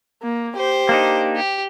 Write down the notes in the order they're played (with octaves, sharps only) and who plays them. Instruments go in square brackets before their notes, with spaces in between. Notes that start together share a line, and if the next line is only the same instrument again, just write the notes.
[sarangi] A#3
[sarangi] G4 [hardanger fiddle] C5
[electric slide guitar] A#3 D4 D#4
[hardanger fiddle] G4